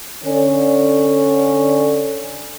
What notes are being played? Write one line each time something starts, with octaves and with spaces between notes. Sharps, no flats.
D3 C#4